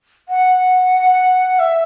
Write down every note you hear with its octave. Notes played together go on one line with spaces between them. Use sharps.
F#5
E5